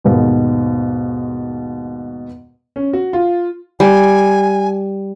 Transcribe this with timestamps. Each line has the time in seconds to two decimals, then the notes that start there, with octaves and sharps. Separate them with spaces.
0.04 D#2 G#2 B2
2.76 C#4
2.93 F#4
3.13 F4
3.80 G3 G#5